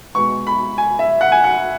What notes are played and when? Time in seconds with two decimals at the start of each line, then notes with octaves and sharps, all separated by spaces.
0.15 B2 G#3 B3 C#6
0.47 B5
0.78 G#5
0.99 E5
1.21 F#5
1.32 G#5
1.44 F#5